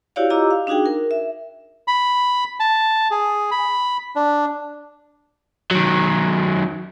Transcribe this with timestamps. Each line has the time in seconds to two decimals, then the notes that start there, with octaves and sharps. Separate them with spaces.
0.16 E4 F#4 G4 C#5 D5 F5
0.30 F4 G4 D#5 A#5 D6 E6
0.51 F5
0.67 D4 D#4 F#4 G#4 G5
0.86 A#4
1.11 E5
1.88 B5
2.60 A5
3.11 G#4
3.51 B5
4.16 D4
5.71 D#3 F#3